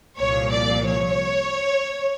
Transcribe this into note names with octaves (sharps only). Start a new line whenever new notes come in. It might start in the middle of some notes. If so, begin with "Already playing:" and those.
C2 A#2 F3 C#5
D5
C#5